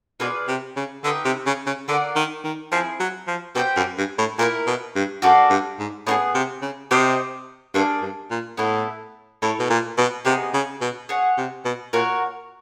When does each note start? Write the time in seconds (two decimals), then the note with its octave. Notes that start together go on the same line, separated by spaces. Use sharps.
0.20 B2 F4 G#4 B4 D5
0.48 C3
0.76 C#3
1.04 D3 D#4 G4 B4 E5
1.25 C3
1.46 C#3
1.66 C#3
1.88 D3 F4 A#4 D5 F#5
2.16 D#3
2.44 D#3
2.72 F3 C4 E4 G#4
3.00 F#3
3.28 F3
3.55 B2 G4 C5 E5 G5
3.76 F#2
3.98 G2
4.18 A2
4.39 A#2 E4 G4 A#4
4.67 B2
4.96 G2
5.22 F#2 F#4 A4 D5 F5
5.50 G2
5.79 G#2
6.07 A2 B3 D#4 G#4
6.35 C3
6.62 C#3
6.91 C3 G4 C5 D#5
7.74 G2 A#3 D4 F4 G#4
8.02 G2
8.30 A#2
8.57 A2 B3 E4 A4
9.42 A2 E4 A4 C#5
9.59 B2
9.70 A#2
9.98 B2
10.25 C3 B3 D#4 G#4
10.54 C#3
10.81 B2
11.09 G#4 C#5 F#5
11.38 C3
11.65 B2
11.93 A#2 F#4 A#4 C#5